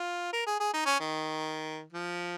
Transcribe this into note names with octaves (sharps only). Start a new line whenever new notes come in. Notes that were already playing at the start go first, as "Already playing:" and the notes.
Already playing: F4
A#4
G#4
G#4
D#4
C#4
D#3
F3